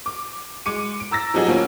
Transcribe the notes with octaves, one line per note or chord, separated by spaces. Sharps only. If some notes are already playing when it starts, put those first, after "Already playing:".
D6
G#3 D6 C#7 D#7
D7
A#5 E6 A6 A#6
C3 F3 F#3 D#4 F#4 G#4
D2 F3 A#3 C#4